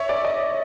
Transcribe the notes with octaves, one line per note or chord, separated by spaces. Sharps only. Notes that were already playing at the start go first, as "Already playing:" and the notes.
Already playing: C#5 E5
D5
D#5